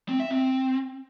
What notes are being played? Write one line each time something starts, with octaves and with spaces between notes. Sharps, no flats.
C4
E5
C4